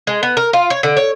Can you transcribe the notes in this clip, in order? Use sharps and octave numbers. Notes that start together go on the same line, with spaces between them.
G#3
B3
A#4
F4
C#5
D3
C#5